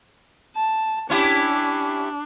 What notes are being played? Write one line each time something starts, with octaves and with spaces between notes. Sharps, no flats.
A5
C#4 D4 E4 G4